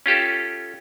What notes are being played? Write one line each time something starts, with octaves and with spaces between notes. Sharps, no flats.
C#4 F4 G4 A4